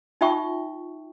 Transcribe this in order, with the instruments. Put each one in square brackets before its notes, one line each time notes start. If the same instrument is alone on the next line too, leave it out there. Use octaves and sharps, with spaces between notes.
[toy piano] D#4 F4 E5 G5 C#6